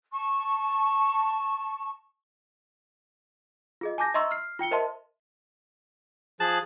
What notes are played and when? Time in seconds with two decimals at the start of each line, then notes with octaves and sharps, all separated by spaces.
0.13 A5 C#6
3.81 F4 G#4 D#5
3.98 G#5 A5 D6 G6 A#6
4.14 D#5 E5 A#5 C6 C#6 E6
4.31 F6 C7
4.59 F4 G5 C#7 G7
4.71 A#4 C5 D#5 E5 A5 C6
6.40 F3 G#4 A5 F#6